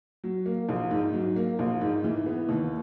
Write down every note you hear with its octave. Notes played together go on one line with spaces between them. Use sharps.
F#3
A#3
A#1
G#2
F#3
A#3
A#1
G#2
E3
B3
D#2